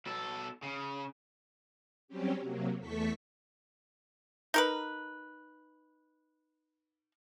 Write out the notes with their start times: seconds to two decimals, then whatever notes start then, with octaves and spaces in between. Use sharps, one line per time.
0.06 B2 A4
0.63 C#3
2.08 F#3 G3 C4 C#4 G4
2.41 C3 F#3 A#3
2.79 E2 A3 A4 C#6 B6
4.54 D#4 A#4 B4